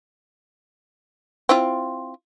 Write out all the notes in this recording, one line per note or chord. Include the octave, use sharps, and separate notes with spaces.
C4 E4 F4